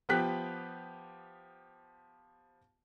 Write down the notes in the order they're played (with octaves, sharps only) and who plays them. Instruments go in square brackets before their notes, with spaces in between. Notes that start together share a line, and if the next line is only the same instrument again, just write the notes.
[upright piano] F3 B3 G4 G5 F#6 B6